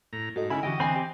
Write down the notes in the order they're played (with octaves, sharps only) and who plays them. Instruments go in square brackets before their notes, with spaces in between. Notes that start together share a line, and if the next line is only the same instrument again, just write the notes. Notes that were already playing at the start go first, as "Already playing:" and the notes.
[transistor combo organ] A2 A#5
[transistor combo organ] G#2 [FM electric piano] F#4 A4 D#5
[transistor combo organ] C#3 E4 [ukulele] D#4 A#4 B5 [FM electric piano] E5 G#5 G#6
[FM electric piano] D3 E3 [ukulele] F#4 G4 G5 [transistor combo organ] D#5
[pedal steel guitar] C4 [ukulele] D4 G#5 B5
[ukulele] G4